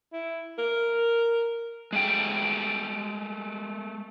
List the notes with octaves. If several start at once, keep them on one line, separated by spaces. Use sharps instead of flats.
E4
A#4
G#3 A3 G5